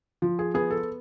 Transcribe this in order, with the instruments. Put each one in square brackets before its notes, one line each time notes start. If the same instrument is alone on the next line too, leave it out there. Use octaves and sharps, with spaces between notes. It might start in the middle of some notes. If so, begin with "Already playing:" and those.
[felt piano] F3
G#4
B3 G#4
A4